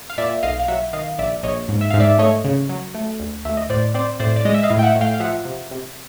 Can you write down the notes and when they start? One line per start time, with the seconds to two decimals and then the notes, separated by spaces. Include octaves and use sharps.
0.10 F5
0.18 A#2 D5 E5
0.43 B1 D#5 F5
0.60 F5
0.68 F#3 E5 F#5
0.93 D#3 D#5 F5
1.18 A#1 D5 E5
1.43 A#1 C#5 D#5
1.68 G#2
1.81 E5
1.90 G#2 F5
2.00 D5 E5
2.18 A3 C#5 D#5
2.44 C#3
2.69 F#3
2.95 A3
3.20 D2
3.45 D2 E5
3.57 D#5
3.70 A2 C5 D5
3.94 C4 C5 D5
4.20 A2 C5 D5
4.36 D5
4.45 G#3 D#5
4.54 E5
4.63 D#5 F5
4.70 A2
4.79 G5
4.82 E5 F#5
4.95 A2
5.01 F5 G5
5.14 F5
5.20 F3 E5 F#5
5.45 C3
5.71 C3